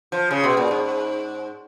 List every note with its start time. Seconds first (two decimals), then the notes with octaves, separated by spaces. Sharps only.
0.12 F3
0.31 C#3
0.44 B2
0.57 A#2
0.71 G#2